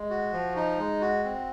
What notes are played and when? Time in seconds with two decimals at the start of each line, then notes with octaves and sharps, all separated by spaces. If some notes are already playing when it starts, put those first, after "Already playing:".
Already playing: G#3
0.10 F#4
0.33 F3
0.56 D#4
0.79 G#3
1.01 F#4
1.24 C4